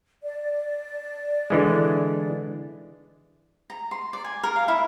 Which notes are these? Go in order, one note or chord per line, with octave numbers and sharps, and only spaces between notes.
D5
D3 E3 G#3
A#5
C6
D5
G#5
A#4
F5
E4